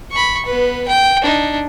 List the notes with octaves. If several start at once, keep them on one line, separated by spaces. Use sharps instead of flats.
B5 C#6
B3 B4
G5
D4 D#4